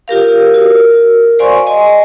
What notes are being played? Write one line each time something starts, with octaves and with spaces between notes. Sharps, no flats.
F4 G4 A#4 F5
F#4 A#4
C5 D5 F5 G#5 C6 C#6
D#5 G#5 C6